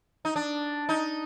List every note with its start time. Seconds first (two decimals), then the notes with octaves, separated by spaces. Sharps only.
0.25 D#4
0.36 D4
0.89 D#4